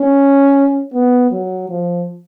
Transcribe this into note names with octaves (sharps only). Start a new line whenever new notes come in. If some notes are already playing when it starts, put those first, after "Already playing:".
Already playing: C#4
B3
F#3
F3